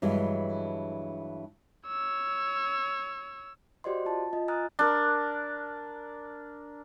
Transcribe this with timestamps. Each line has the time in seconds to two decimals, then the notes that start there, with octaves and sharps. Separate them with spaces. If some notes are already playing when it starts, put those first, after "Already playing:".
0.02 G2 E3 F#3 G#3
1.86 C#5 E6
3.84 F#4 G4 C5 D5 D#5 C6
4.05 F4 A5
4.33 F4 D#5
4.48 G#5 A#5 D#6 F6 F#6 A6
4.79 D4 A#4